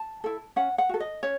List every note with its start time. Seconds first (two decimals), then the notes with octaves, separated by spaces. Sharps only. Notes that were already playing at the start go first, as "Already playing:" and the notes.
Already playing: A5
0.24 E4 A4
0.56 C#4 F#5
0.78 F#5
0.89 F#4 A4
1.00 D#5
1.23 C#4 C#5